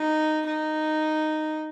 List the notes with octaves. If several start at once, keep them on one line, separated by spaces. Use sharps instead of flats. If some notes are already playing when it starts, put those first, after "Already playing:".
Already playing: D#4
D#4